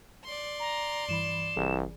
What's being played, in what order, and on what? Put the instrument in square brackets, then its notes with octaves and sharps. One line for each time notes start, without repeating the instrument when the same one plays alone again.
[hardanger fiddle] D5 C6
[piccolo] A#5
[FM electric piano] G2 E3 B5 [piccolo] E7
[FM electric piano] G1 E3 G#4 [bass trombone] C2